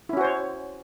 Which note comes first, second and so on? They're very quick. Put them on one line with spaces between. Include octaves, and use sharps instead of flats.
E4 C#4 F#4 C5 C#5